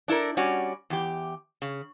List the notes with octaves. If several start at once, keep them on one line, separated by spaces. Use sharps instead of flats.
D4 E4 A4 A#4
G3 C#4 F#4 D5
E2 G4
C#3